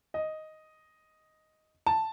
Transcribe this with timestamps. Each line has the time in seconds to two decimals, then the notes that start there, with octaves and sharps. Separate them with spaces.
0.14 D#5
1.86 A5